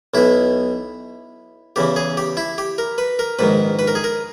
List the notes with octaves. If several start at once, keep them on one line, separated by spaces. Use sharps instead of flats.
B1 B2 E4
E2 C#3 E3 G4
G#4
G4
E4
G4
A#4
B4
A#4
A#1 G#2 D#3 B4
B4
A#4
G#4
A#4